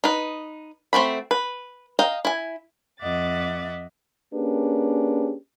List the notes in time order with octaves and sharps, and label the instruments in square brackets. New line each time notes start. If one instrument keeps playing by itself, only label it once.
[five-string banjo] D#4 B4
A3 C4 F#4 B5
B4
D#5 F5 G5 A#5
E4 G#5
[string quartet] F2 D#5 E5 F#5 D6 A6
[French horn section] A#3 C#4 D4 G4 G#4 B4